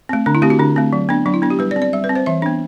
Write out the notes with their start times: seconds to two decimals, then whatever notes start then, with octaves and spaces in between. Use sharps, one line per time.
0.09 A3 C4
0.26 D3 D4
0.35 E4
0.42 A3 C4 G4
0.50 F#4
0.59 D3 D4
0.76 A3 C4
0.93 F#3
1.09 B3 D4
1.26 F#3 D4
1.34 E4
1.42 B3 D4
1.50 G4
1.59 G3 B4
1.71 D5
1.76 C4
1.82 D5
1.93 G3 E5
2.04 B4
2.09 C4
2.15 C5
2.26 E3 E5
2.42 B3 D4